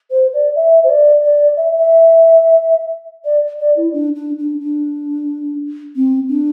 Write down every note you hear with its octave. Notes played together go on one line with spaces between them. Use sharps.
C5
D5
E5
C5
D5
D5
E5
E5
D5
D5
E4
D4
D4
D4
D4
C4
D4